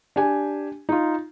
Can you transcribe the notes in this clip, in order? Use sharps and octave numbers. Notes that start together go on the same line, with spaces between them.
D4 G4 G#5
D#4 F4